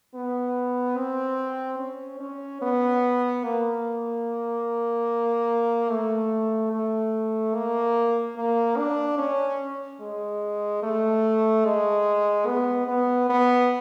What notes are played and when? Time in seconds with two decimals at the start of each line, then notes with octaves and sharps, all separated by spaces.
0.15 B3
0.97 C4
1.79 C#4
2.20 C#4
2.62 B3
3.44 A#3
5.90 A3
6.72 A3
7.55 A#3
8.36 A#3
8.77 D4
9.18 C#4
10.00 G#3
10.83 A3
11.65 G#3
12.47 B3
12.88 B3
13.30 B3